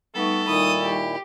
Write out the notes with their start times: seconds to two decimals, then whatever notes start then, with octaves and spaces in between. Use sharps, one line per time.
0.15 G3 A3 B3 D#4 A4 C#6
0.48 A#2 D#3 E4 D#6
0.81 G4